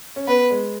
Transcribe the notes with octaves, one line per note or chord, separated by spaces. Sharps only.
C#4
B3 B4
G#3